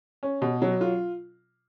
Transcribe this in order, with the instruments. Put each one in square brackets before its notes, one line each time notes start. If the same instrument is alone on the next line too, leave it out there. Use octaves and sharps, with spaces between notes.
[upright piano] C#4
B2
F#3
F4